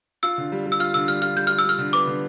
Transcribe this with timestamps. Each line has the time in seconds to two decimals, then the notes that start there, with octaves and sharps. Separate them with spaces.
0.23 F4 E6
0.38 D3
0.52 G3
0.66 G3
0.72 E6
0.80 F4 F6
0.94 D3 E6
1.08 G3 F6
1.22 F4 F6
1.36 G3 G6
1.47 F4 F6
1.59 E6
1.64 G3 F6
1.78 D3
1.93 B3 D6
2.07 D3